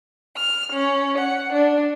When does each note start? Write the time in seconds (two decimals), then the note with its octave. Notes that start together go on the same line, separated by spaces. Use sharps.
0.37 F6
0.73 C#4
1.18 F#5
1.54 D4